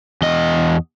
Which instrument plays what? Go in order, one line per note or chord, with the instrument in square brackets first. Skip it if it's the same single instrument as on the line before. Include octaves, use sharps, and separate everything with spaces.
[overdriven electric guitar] E2 D#5